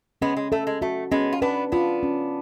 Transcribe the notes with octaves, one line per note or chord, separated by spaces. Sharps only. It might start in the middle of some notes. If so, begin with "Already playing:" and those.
G#3 B3 C#4
G#3
A3 A4
G#3
A3 F#4
G#3 B3 C#4
F4
B3 D4 B4
B3 D4 F4
C#4